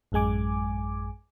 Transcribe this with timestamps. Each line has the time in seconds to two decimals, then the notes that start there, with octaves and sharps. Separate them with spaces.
0.12 A1 F#2 G#3 G#5 D6